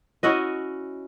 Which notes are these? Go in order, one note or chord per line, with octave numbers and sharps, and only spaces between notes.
C#4 E4 F#4 D#5